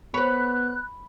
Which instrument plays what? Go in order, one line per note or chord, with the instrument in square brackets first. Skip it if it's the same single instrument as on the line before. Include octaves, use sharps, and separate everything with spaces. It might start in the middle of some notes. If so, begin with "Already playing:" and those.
[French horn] B3 [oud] B4 C#5 [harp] B5 [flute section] F#6